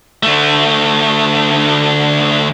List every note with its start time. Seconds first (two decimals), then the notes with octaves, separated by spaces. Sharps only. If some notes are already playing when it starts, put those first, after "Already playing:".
0.23 D2 A3